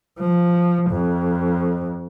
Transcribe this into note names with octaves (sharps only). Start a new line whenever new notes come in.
F3
F2